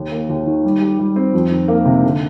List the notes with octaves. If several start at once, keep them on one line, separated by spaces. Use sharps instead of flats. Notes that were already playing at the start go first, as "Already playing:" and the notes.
Already playing: D#2
A#3
D#2
D#3
G3
G4
G3
C4
F2
D#3
A#3
C3
D3